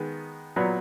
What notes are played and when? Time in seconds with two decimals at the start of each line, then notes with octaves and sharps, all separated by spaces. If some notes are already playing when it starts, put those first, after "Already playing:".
Already playing: D#3 G#3 B3
0.56 A#2 F#3 B3